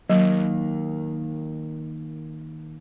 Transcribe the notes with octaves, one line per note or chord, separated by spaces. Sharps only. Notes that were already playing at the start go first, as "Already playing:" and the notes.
D#3 F#3 A#3